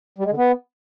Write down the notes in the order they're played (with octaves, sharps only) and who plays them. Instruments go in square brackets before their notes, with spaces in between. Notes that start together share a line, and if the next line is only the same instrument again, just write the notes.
[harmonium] G3
G#3
D3
B3